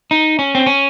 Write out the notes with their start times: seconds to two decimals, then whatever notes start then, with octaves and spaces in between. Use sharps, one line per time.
0.11 D#4
0.39 C#4
0.55 C4
0.66 C#4